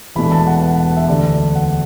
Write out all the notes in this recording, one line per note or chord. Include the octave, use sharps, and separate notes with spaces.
E1 E2 B2 A3 D4 B5
A5
F#5
F#5
F#5
E5
E1 D2 D3 A3 D5
D5
D5
F#5